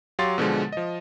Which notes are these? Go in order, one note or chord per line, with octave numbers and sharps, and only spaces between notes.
F#3 G4 F5 C6 A6
B2 D3 F3 G#3
F3 D#5